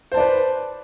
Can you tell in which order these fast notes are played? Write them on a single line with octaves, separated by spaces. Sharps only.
C5 A5 D5 B4